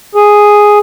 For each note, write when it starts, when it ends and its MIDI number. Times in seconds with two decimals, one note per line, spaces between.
0.15 0.79 68